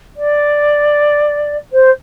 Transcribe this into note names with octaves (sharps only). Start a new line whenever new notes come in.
D5
C5